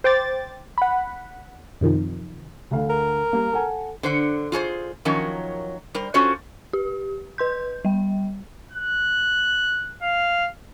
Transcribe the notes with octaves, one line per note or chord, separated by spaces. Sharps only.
C5 G5 D6 A6
F#5 B5
F#2 C3 D#3 F3
D2 D3 F5
A#4
G3 A#3
A4 F#5 G#5
D3 C5 F#5
F4 G#4 A4 C5
D#3 F3 F#3 C#4 A#4 C#5
G3 A#4 C5
C#4 F4 F#4 A4 C5 C#5
G4
B4 C6 G6
G3 G5
F#6
F5